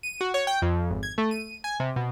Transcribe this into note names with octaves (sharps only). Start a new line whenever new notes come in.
D#7
F#4
C#5
G5
F2
G#1
G#6
A3
D#7
G#5
C3
B2